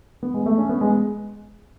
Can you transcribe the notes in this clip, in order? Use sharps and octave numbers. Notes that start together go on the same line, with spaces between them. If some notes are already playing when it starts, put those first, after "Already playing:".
B3
G#3
A3
C#4
B3
G#3